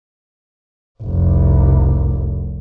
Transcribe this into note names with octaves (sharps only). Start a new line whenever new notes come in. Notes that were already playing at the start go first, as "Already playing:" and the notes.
F1 C2